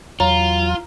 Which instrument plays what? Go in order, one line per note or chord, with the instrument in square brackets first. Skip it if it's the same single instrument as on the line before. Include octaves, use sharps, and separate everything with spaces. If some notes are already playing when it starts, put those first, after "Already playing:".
[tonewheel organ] E2 F#3 [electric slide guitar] F4 [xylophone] A#5